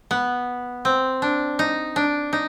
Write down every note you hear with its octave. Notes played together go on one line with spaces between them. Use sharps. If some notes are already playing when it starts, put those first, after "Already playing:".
B3
C4
D4
D#4
D4
D#4